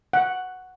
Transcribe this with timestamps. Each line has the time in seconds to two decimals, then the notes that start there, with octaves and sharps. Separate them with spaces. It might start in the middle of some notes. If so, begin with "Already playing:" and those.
0.13 F#5